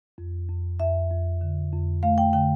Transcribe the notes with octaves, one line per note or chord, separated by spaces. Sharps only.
F2
F2
F2 E5
F2
D3
F2
A3 F5
G5
D3 G5